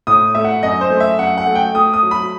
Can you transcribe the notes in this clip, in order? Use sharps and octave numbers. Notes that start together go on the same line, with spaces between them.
A2 D#6
A3 E5
F#5
F#2 D#5
C5
A3
E5
F#2 F#5
F#5
A3
G5
A3 D#6
D#6
F#3
B5